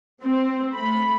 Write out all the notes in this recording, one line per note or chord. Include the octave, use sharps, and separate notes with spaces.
C4
A3 B5